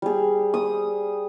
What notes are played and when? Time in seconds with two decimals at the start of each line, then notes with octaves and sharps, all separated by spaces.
0.02 G3 G#4
0.54 D#6